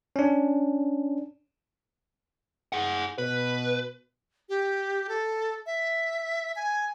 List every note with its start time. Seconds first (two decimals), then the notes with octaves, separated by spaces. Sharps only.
0.16 C#4 D4
2.73 G#4 F#5
3.18 B2 B4
4.49 G4
5.09 A4
5.66 E5
6.56 G#5